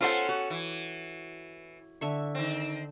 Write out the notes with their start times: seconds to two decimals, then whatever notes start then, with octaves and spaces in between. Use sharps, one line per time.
0.01 C#4 F4 A4 C5 F#5
0.29 F#4
0.50 E3
2.01 D3 E5 C#6
2.35 D#3 C4